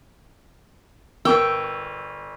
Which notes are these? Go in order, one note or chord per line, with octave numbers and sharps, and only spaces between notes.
G1 A#4 G5 C#6 E6